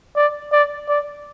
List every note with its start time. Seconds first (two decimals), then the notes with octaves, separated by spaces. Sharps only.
0.16 D5
0.52 D5
0.88 D5